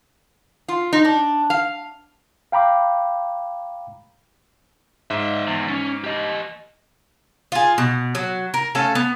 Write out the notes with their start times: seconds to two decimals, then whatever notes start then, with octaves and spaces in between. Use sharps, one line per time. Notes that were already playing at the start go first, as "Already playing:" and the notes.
0.68 F4
0.93 D#4
1.05 D4
1.50 F5
2.52 F5 G5 A#5 B5 D6
5.10 G#2 D#5 E5
5.47 E2
5.69 C#4
6.04 G4 D#5
7.52 F4 G#4
7.78 B2
8.15 F#3
8.54 A#4
8.75 A3 C#4 A4 F5
8.95 B3